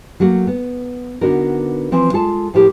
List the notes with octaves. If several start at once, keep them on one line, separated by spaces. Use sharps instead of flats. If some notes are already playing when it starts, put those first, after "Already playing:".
F#3 A3 A#3 F#4
B3
D3 B3 D4 D#4 F#4 A#4
E3 F3 C4
G#3 F4 A4 A5
A2 F3 E4 G4 A#4 C5